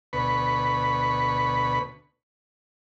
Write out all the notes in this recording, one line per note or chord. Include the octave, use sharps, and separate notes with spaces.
D2 B2 B4 B5 C#6